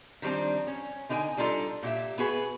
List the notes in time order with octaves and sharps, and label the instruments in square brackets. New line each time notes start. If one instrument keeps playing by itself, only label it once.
[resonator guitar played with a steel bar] D#3 F3 G3 C4 D4
C#4
D3 D#4 G4 B4 G5 G#5
G3 D4 D#4 F4 A4
A#2 G4 E5
B3 F#4 G#4 B4